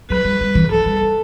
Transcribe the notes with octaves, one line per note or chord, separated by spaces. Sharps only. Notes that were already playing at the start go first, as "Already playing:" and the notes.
F#3 B4
G3
G3
E3
F#3 A4
G3
B3